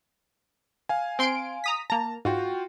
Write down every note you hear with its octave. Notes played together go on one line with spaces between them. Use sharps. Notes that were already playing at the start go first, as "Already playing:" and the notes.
F5 G#5
C4 C6 D7
A#5 D#6 B6
A#3 A5 A#5
G#2 F4 F#4 G5